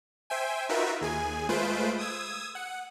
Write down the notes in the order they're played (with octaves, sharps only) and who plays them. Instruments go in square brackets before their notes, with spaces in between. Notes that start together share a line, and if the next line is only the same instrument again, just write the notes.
[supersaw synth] C5 E5 G5 G#5
D#4 F4 F#4 A#4 B4 E5
D#2 G#4 G#5
G#3 A3 F4 B4 C5 D7
D#6 E6 G#6
F#5